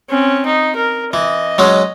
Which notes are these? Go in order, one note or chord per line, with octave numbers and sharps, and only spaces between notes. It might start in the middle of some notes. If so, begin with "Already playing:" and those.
C4 C#4
D#4
A#4
E3 D#5
F#3 G#3 C#4